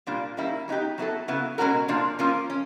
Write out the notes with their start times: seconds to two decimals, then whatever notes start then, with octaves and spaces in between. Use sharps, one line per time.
0.07 A#2 G3 A#3 D4 F4
0.37 D#3 G3 A#3 C#4 E4
0.68 F#3 B3 D#4 G4
0.98 F#3 B3 E4 A4
1.28 C#3 F#3 B3 E4
1.58 B2 G#3 C#4 F#4 A#4
1.88 A#2 F3 A#3 D4
2.19 F3 A#3 C#4 F4 A#4
2.50 C#4